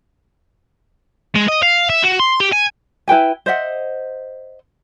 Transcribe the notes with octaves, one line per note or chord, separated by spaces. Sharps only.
G#3
D#5
F5
E5
F#4
C6
G4
G#5
E4 B4 G5 G#5
C5 D#5 E5 F#5